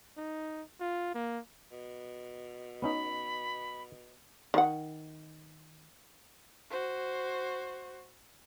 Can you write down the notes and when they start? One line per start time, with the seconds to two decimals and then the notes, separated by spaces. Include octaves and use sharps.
0.17 D#4
0.80 F4
1.15 A#3
1.72 B2
2.82 B3 C#4 D#4 B5
4.54 D#3 F#5
6.71 F#4 C5